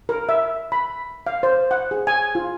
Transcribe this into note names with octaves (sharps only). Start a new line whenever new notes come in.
A#4
E5
B5
F5
C5
F#5
G#4
G#5
F4